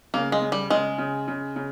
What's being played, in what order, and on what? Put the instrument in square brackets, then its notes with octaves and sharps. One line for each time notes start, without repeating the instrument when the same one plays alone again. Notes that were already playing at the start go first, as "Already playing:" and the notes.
[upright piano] C#3 [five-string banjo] A#3
[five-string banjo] G#3
[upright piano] C#3
[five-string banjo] G3
[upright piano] C#3 [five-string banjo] G#3
[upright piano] C#3
C#3
C#3